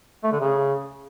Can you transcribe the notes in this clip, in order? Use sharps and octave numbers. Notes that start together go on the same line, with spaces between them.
A3
D3
C#3